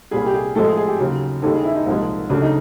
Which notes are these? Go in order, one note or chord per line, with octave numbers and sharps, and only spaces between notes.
C2 A#2 G3 G#4
G4
G#4
A2 F3 G#3 A4
G#4
G#4
G4
D#2 C#3 F#3
D#2 D#3 G3 A4
G#4
E4
D#4
C2 A#2 F3 G#3
D2 C#3 F#3 D4
D#4